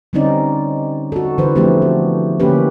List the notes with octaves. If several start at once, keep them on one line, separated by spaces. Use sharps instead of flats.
D3 G3 C4 C#4 D#4 D5
F#4 A4
D3 E3 D4 B4 C5
F3 A3 B3 C4 D4 G4
F#4
D3 E3 A#3 C#4 G4 B4